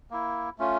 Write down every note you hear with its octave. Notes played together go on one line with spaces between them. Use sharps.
A#3 E4
A3 C#4 F4